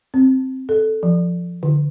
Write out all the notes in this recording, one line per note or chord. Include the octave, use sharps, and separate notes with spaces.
C4
A4
F3
D3